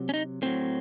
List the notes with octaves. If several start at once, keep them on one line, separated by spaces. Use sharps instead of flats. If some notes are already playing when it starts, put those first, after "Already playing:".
Already playing: C3 F#3
C#4
D#4
A2 F#3 C4